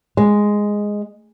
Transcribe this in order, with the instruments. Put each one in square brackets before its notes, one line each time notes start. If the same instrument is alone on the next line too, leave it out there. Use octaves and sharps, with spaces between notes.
[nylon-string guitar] G#3